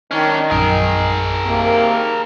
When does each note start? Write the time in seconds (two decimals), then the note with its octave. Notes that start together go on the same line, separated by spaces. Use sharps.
0.11 D#3 C#4 D4
0.51 A#1 F#2 G#4 A#4
1.45 C3 D#3 A#3